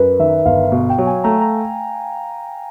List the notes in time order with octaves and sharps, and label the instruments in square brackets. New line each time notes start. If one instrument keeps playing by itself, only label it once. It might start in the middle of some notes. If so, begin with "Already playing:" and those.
Already playing: [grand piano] F#2 [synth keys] A#4 B4
[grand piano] D#3 [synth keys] E5
[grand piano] G1 [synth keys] F5
[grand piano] B2 [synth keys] F5
[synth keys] G5
[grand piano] F#3
[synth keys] G#5
[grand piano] A3 [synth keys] A#5
[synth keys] A#5